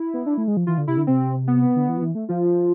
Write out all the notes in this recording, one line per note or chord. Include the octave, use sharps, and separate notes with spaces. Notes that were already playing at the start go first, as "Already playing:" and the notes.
Already playing: E4
B3
D4
A3
G#3
F3
E3 F4
D3
C3 E4
D3
C3 C4
B3
D3
E3
F3
E3
A3
F3 F4